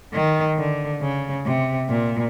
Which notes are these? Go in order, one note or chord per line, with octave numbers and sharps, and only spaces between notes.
D#3
D3
C#3
C3
A#2